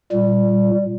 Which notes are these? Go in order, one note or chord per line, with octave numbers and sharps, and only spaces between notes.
A#2 G3